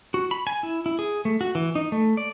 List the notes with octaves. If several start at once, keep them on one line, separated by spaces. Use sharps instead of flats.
F#4
B5
G#5
E4
E4
G#4
A3
F#4
E3
D#4
A3
D5